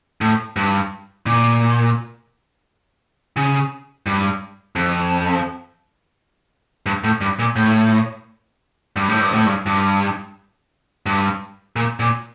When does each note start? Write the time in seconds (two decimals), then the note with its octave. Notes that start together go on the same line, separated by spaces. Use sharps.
0.21 A2
0.56 G2
1.26 A#2
3.37 C#3
4.06 G2
4.76 F2
6.86 G2
7.04 A2
7.21 G2
7.39 A#2
7.56 A2
8.96 G2
9.09 A2
9.21 G2
9.34 A2
9.46 G2
9.66 G2
11.06 G2
11.76 A#2
12.00 A#2